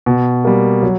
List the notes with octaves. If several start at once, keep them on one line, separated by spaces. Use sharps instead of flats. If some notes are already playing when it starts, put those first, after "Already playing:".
B2
G3 A#3
F#3